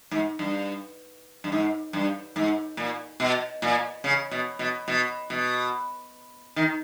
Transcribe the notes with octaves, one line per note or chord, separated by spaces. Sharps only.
G#2
G2
G2
G#2
G2
G#2
A#2
B2
A#2
C#3
B2
B2
B2
B2
D#3